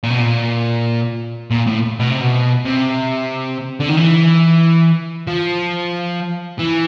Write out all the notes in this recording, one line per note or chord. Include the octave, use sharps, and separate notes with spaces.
A#2
B2
A#2
A#2
A2
B2
C3
B2
C3
D3
D#3
E3
F3
E3